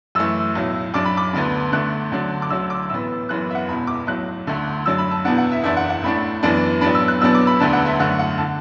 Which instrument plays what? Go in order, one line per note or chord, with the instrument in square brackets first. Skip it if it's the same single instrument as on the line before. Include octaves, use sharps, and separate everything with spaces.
[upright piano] F#2 E3 A3 E6
B1 A2 F#3
F#2 F#3 D4 D6
B5
D6
D2 D3 B3 D4
D2 D3 A3 D4 F#6
D2 D3 F#3 D4
D6
D2 D3 F#3 E6
D6
A1 A2 E3 B3 E6
F#1 F#2 E3 B3 F#6
E5
F#5
E1 E2 B2 B5
D6
B1 A2 F#3 F#6
D2 D3 A3
F#2 F#3 D4 E6
B5
A5
E2 B2 B3 D4 F#5
F#5
E5
F#1 E2 E3 D4 E5
F#5
F#5
A1 A2 A3 D4 B5
F#2 E3 B3 D4
A1 A2 F#3 B3 D4 B5
E6
F#6
E2 B2 F#3 B3 D4 E6
D6
B5
E1 D2 D3 B3 D4 A5
F#5
E5
F#2 D3 A3 F#5
F#5
D3 A5